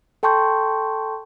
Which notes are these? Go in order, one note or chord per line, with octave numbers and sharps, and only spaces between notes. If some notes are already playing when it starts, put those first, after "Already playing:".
A4 G5 A5 C6 C#6 G6